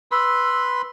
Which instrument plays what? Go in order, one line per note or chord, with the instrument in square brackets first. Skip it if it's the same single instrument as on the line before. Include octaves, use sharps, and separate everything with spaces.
[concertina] B4 B5 C6 [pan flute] E6